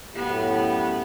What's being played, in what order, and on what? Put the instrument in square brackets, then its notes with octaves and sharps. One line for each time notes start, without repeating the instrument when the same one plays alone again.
[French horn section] F#2 A2 G4 [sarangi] B3